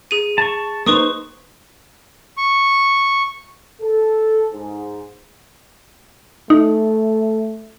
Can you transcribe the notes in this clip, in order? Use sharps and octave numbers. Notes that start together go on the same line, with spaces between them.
G#4 D#7
A5 C#6
A#3 D#4 B4 C5 C#6 D#6
C#6
A4
G#2
A3 D#4